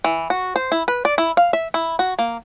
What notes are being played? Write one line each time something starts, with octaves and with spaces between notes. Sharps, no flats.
E3
F#4
C5
E4
B4
D5
E4
F5
E5
E4
F#4
A#3